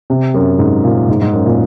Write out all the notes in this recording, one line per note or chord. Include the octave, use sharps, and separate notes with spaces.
C3
F#2
G#2
A#2
G#2
G#2
F#2
A#2